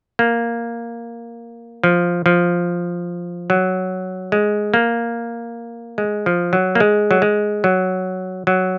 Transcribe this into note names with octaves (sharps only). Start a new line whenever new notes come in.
A#3
F3
F3
F#3
G#3
A#3
G#3
F3
F#3
A#3
G#3
F#3
G#3
F#3
F#3